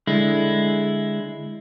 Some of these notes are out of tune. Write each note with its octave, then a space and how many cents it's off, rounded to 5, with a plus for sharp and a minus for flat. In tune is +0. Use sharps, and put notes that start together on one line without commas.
D3 +0 G#3 +0 E4 +0